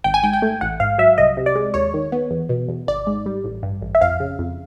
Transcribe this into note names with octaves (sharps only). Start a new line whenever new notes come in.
G#1 G5
G#5
G#2 G5
G5
A3
A1 F#5
G#2 F5
F#3 E5
C2 D#5
C3
D5
G#3
D#2 C#5
D#3
B3
E2
B2
E2
G#1 D5
G#2
G3
A1
G2
A1
E5
F2 F5
C#3
F2